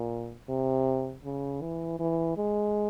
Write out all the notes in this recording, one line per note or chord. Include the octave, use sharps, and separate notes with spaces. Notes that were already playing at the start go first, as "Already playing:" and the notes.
Already playing: A#2
C3
C#3
E3
E3
G#3